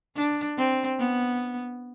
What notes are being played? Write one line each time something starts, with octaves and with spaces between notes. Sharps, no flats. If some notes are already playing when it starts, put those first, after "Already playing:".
D4
C4
B3